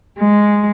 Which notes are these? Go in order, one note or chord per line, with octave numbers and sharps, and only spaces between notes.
G#3